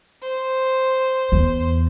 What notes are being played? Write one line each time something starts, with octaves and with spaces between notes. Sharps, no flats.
C5
E2